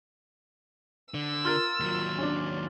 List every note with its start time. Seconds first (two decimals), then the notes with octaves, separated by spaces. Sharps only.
1.14 D3 E6
1.45 F4 A#4 C6 F6 A6
1.80 D#2 F#3
2.18 C#4 D4